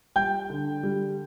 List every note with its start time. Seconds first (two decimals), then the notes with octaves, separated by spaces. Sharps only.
0.16 G3 G5 G6
0.50 D3
0.83 G3